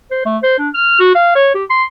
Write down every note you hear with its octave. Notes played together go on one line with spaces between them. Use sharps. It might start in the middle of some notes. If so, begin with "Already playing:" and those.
C5
A3
C5
D4
F6
F#4
F5
C#5
G4
C6